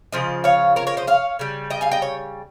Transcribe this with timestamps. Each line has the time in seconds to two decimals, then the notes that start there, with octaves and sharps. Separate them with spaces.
0.12 C#3 F3 D#5
0.44 C#5 F5
0.76 A#4 C#5
0.87 A#4 C#5
0.97 C5 D#5
1.07 C#5 F5
1.39 C#3 G3
1.70 D#5 G5
1.81 F5 G#5
1.91 D#5 G5
2.02 C#5